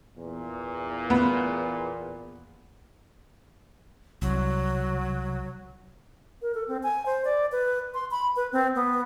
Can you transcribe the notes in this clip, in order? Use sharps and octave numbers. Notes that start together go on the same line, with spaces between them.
E2 A#2
B3
C2 F#3
A#4
A4
C4
G#5
C5
D5
B4
C6
B5
B4
C4
B3